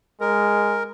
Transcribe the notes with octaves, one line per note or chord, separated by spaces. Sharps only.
G#3 A#4